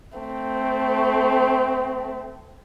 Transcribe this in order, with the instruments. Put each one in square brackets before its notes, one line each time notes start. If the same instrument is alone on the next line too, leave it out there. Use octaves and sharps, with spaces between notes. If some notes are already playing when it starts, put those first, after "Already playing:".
[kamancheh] A3 C4